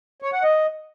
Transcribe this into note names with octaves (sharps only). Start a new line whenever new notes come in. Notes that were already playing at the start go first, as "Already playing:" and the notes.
C#5
F#5
D#5